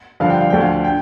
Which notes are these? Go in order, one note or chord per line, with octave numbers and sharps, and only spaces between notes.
G2 D3 F3 F5
G5
F5
D2 D3 F3 G5
F5
G5